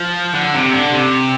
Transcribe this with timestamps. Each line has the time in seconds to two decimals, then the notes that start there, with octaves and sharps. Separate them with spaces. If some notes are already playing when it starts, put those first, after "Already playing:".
Already playing: F3
0.35 D3
0.54 C3
0.73 D3
0.92 C3